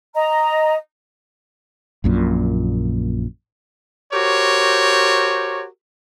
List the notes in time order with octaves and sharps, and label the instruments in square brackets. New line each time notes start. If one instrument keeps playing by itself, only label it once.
[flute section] D#5 A#5
[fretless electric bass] A#1 F#2 A#2
[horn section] F#4 G4 A#4 C5 C#5